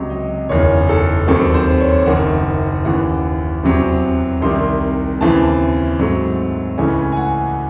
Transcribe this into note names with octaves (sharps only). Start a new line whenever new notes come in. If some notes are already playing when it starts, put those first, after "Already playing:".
Already playing: C#2 C3 F#3 D#5
D#5
F#1 E2 D#3 C#5
A4
D#2 D#3 F#3 C4 A4
C5
C#5
F#1 F#2 D#3 F#5
D#2 C#3 E3 F#5
E2 C3 F#3 C4
C2 C3 D#3 C6
D#2 C#3 E3 C4 A5
G#2 F#3 A3 C4
C#2 C#3 E3 A3 C#4 G#5
G#5
F#5